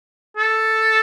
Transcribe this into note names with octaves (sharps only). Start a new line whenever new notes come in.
A4